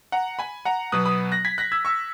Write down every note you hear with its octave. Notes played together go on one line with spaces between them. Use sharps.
F#5 A#5
G#5 B5
F#5 A#5
B2 F#3 B3 D#6 F#6
B5 D#6
F#6 A#6
G#6 B6
F#6 A#6
E6 G#6
C#6 E6